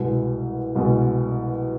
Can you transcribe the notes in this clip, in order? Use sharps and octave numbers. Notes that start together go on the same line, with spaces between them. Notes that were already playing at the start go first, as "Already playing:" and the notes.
Already playing: C2 B2 G#3 B3
C2 B2 G#3 B3